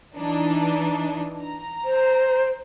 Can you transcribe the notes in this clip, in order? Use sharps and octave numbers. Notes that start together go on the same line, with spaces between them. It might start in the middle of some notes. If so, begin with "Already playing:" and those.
E3 D4 D#4
A#5
C5